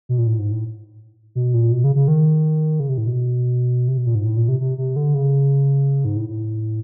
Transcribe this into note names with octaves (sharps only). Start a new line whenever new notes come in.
B2
A#2
A2
G#2
A2
B2
A#2
B2
C#3
C#3
D#3
C#3
C3
A2
B2
C3
B2
A#2
G#2
A2
A#2
C3
C3
C3
D3
C#3
G#2
A2
A2